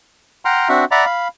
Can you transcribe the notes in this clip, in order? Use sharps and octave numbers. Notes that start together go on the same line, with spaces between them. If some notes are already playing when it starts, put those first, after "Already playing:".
F#5 G5 A#5 C6 F6
C4 D4 F#4 E5 F#5
D5 E5 F#5 A#5 B5 D6
F5 B5